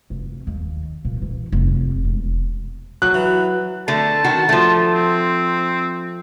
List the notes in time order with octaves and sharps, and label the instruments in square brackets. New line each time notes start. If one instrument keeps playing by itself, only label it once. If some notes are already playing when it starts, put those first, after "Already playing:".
[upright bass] F1
D#2
A#2
E3
F1
E1
[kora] F#3 [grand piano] F#6
[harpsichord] E3
[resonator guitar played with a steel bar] D3 A3 [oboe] A5
[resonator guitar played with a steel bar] D#3 F#4
F3 A3
[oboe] C4